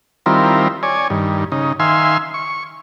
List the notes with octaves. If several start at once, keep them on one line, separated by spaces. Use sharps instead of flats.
D#3 G3 C4 E4 F4 A#4
C#5 D5 G#5
G2 D#3
C#3 D#4
D#3 E5 F5 G#5 C6
C#6